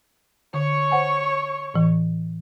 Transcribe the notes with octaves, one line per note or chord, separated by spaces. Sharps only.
D3 C#5 C#6
C5 F#5 G#5
A2 E3